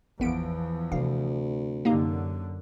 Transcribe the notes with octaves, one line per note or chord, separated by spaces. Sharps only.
G#1 E2 E3 F3 B3 D7
D2 C3 F5
F#2 D3 A#3 D#4 G4